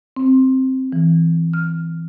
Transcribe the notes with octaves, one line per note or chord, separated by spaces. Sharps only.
C4
E3
F6